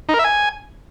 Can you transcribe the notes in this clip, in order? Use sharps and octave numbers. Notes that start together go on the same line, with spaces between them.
D#4
A#4
E5
G#5